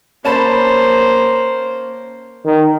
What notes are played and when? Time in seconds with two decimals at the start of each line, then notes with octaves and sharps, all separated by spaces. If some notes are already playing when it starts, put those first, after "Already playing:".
0.24 A#3 C#4 C5 A5 B5
2.45 D#3